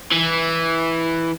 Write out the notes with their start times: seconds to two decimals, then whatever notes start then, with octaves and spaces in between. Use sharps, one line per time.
0.11 E3